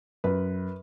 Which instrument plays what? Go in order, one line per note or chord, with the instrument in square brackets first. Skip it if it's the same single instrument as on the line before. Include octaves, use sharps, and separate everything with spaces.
[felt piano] F#2 B4